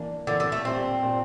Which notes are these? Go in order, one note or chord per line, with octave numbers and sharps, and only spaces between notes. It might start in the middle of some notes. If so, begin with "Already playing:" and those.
Already playing: E3 A#3 D4
D3 E3 A#3 D4
D3
A3
A#2 G3 C4 D4
A#2 G3 D4